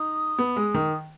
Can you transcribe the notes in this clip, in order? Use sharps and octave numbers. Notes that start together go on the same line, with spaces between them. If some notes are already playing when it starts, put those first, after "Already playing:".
Already playing: D#4 D#6
B3
G#3
D#3